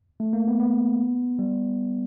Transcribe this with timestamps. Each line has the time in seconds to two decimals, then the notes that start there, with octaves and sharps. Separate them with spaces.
0.20 A3
0.33 A#3
0.48 B3
0.59 B3
1.39 G3